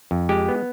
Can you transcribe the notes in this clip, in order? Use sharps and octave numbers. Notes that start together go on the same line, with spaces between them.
F2
G#3 G4
B3